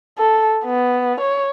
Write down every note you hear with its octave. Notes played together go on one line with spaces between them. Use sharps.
A4
B3
C#5